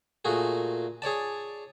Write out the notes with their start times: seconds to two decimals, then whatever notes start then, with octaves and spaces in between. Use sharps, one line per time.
0.25 A#2 A3 F#4 G#4
1.02 G#4 C#5 D5 A5